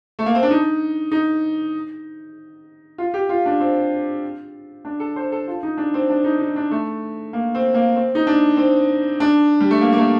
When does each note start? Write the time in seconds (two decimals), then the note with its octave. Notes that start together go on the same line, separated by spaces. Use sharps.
0.19 A3
0.26 A#3
0.35 C4
0.43 D4
0.51 D#4
1.12 D#4
2.98 F4
3.14 G4
3.29 F4
3.46 D4
3.60 C4
4.85 D4
5.00 A4
5.16 C5
5.32 A4
5.47 F4
5.63 D#4
5.77 D4
5.94 C4
6.10 D4
6.24 D#4
6.40 D#4
6.56 D4
6.71 A3
7.33 A#3
7.55 C4
7.74 A#3
7.96 C4
8.15 D#4
8.27 D4
8.57 C4
9.20 D4
9.60 G3
9.71 A3
9.81 A#3
9.92 A#3
9.98 A3